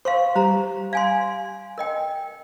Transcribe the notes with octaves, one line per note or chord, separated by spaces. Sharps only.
C5 F5 C6 C#6
G3 G4 C5 A#5
F5 G#5 C6 G#6
A#4 D#5 G5